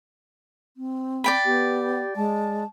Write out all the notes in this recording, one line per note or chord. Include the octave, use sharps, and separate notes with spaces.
C4
D5 G5 B5
B3 G4
G#3 A5